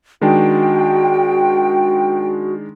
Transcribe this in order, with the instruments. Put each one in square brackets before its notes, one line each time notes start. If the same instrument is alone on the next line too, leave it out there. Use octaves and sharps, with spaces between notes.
[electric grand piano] D#3 G#3 D4 [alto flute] F#4 [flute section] G5